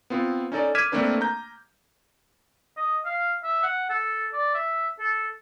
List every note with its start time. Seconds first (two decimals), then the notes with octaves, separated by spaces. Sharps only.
0.10 B3 C4 F4
0.52 C#4 D#4 A4 D5
0.75 D6 F6 G#6 B6 D#7 E7
0.92 A3 A#3 C4 D4 B4
1.21 A#5 G6
2.77 D#5
3.06 F5
3.44 E5
3.63 F#5
3.90 A4
4.33 D5
4.55 E5
4.99 A4